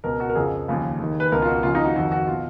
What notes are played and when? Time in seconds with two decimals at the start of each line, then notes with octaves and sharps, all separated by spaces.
0.04 C#2 B2 A#4
0.20 F#4
0.29 A#4
0.35 F2 C#3 F3 G#4
0.68 D#2 C#3 F3
0.99 D#2 D#3
1.20 B4
1.32 C#2 B2 A#4
1.42 F4
1.48 F#4
1.63 D#2 C#3 F3 F4
1.75 D#4
1.85 F#4
1.95 F2 D#3 F#4
2.12 F#4
2.27 B2 F4